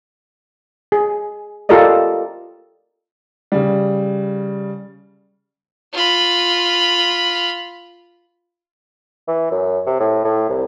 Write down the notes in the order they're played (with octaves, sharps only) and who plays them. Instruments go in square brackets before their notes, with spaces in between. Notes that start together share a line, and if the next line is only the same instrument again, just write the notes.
[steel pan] G#4
F4 G4 A4 A#4 D5 D#5
[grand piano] C#3 G3
[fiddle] F4 B5
[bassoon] E3
F#2
C3
A2
A2
C2